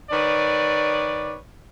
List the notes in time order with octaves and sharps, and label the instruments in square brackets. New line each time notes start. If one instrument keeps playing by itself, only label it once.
[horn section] D#3 B4 C#5 D5